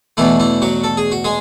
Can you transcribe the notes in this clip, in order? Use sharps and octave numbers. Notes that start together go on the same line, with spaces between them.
E2 B2 E3 A3 E4
E3 E4
F#3 F#4
A4
G#4
F#4
G#3 G#4